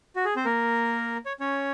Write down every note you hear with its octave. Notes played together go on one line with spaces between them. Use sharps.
F#4
G#4
C4 C5
A#3 A#4
C#5
C#4 C#5